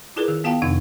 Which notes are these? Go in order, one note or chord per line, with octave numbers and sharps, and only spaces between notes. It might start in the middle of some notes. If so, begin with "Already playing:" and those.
E4 F4 G#4 A#4 B4
D#3
B3 F4 F5 G5 A5
F2 C3 D#3 D4 D#4